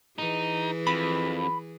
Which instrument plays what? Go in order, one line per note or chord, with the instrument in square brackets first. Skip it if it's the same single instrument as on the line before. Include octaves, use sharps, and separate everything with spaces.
[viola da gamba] E3 G#4 [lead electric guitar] D#4
[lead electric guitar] F2 [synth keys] B5